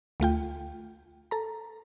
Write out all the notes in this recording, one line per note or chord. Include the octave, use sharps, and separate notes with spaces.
D2 A3 F4 G5
A4 A#5